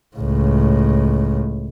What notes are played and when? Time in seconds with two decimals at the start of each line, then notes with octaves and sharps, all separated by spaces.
0.16 C#2 A2